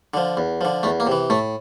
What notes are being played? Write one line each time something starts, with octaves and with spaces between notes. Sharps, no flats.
D3 F3
E2
D3 F3
E2 A3
A#3
C3 E3
A2 A3